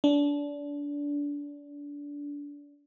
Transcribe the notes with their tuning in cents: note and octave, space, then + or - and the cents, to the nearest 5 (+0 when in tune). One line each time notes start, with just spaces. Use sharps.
D4 -25